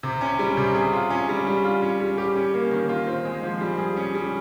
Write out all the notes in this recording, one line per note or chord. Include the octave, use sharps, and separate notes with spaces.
C3
C#4
G3
C3
G#4
F4
C#4
G3
G3
F4
C#4
G3
G4
C#4
A#3
D#3
F4
C4
G#3
F3
G3
G#4
C#4
G3